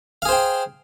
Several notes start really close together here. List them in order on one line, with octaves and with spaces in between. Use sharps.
F5 G#4 C5 G5